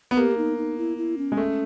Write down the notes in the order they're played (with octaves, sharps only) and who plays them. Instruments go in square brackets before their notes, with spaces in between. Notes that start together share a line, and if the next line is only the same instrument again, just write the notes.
[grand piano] B3
[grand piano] A#3 [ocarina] G4
[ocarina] D#4
D#4
E4
E4
C#4
[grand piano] G#3
A3